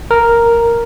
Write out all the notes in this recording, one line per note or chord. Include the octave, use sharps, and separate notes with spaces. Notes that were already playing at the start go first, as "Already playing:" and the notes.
A#4